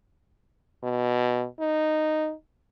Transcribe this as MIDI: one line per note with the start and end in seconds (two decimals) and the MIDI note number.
0.84 1.45 47
1.60 2.33 63